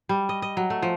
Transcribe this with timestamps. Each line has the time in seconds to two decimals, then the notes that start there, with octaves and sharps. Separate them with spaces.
0.09 G3
0.29 D#5
0.42 D#5
0.57 F#3
0.70 A3
0.83 F3